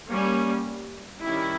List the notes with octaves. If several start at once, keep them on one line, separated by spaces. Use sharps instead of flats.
G3 A#3 C#4
D#3 G3 C#4 E4